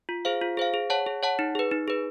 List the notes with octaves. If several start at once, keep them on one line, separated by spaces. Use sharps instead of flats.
F4
G#4 C5 F5
F4
G#4 C5 F5
G#4
C#5 F#5 A5
G#4
C#5 F#5 A5
D#4
G#4 B4
D#4
G#4 B4